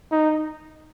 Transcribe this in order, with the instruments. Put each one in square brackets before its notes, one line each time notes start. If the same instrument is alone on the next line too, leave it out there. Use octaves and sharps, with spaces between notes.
[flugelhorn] D#4